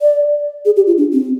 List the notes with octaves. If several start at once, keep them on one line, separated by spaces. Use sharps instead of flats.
D5
G#4
G4
F4
D4
C4